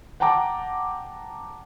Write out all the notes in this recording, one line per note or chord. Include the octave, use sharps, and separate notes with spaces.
F#5 G5 A5 A#5 D6